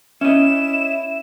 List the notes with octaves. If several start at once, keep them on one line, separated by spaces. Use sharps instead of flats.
C#4 E4 D#5 E7